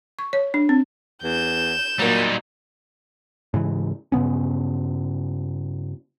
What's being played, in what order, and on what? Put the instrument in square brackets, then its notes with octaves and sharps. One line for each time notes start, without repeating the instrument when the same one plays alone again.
[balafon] C#6
C#5
D4
C4
[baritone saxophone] E2 [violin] G6 E7
[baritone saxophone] A#2 [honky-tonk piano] F#3 A#3 [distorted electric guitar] G3 D#4
[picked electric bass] G#2 C#3 E3
G2 C#3 B3 C#4